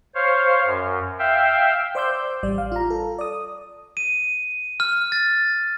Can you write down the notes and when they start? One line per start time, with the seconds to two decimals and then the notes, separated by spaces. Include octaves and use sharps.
0.15 C5 C#5 F5
0.66 F#2
1.19 E5 F5 G5
1.95 C5 D5 C6 D6 E6 G6
2.43 A1 G3 D5
2.58 F5
2.72 F4 A#5
2.90 A4
3.19 D5 D#6
3.97 D#7
4.80 F6
5.12 A6